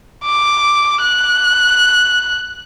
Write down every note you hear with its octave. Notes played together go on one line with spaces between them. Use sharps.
D6
F#6